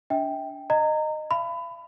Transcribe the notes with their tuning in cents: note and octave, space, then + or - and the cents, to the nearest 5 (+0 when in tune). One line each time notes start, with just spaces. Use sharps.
D4 -30 E5 -40 G5 +0
D#5 -15 A#5 -25
F5 -40 B5 +25